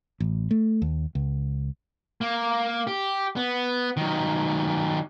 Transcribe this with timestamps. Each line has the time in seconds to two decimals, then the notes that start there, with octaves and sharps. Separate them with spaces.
0.20 A1
0.51 A3
0.82 D#2
1.15 C#2
2.21 A#3
2.87 G4
3.36 B3
3.97 D#3 F#3